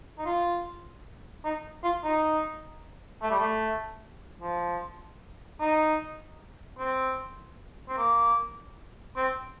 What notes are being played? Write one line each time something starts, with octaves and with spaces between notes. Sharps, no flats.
D#4
F4
D#4
F4
D#4
A3
G3
A3
F3
D#4
C4
C4
A#3
C4